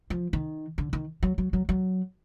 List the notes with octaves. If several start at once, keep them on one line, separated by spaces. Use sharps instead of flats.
F3
D#3
D3
D#3
F#3
F#3
F#3
F#3